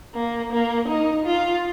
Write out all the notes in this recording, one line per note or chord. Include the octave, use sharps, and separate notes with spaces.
A#3
A#3
D#4
F4